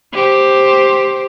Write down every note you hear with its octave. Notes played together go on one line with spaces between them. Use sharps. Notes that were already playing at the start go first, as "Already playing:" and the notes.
G4 C5